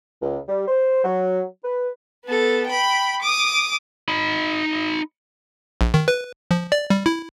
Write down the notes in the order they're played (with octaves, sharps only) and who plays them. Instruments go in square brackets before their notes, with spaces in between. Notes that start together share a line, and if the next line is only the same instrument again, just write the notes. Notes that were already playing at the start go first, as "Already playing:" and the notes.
[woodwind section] C#2
G3
C5
F#3
B4
[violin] B3 A4
G5 B5
D6 D#6
[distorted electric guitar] D#4 B5
[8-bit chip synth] A#1
D#3
B4
F3
D5
G3
E4